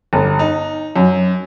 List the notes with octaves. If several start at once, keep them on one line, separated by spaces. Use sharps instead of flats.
G1
D#4
F#2